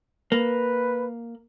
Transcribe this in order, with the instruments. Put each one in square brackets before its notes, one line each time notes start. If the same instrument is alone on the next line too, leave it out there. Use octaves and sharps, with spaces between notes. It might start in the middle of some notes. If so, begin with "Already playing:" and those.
[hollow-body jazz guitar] A#3 [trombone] B4